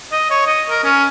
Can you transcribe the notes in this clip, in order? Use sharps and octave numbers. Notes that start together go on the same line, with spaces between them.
D#5
C#5
D#5
A#4
C#4